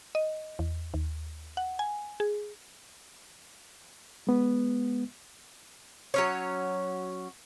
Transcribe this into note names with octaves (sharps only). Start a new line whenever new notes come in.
D#5
E2
D#2
F#5
G#5
G#4
G#3 B3
F#3 C#4 C#5